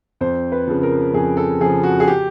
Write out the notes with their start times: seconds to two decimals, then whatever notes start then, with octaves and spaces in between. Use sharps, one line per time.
0.21 F2 C5
0.52 B4
0.68 C#3 F3
0.83 A#4
1.14 F2 G#4
1.37 A4
1.61 F3 G#4
1.65 C#3
1.83 F#4
2.00 G#4
2.07 G4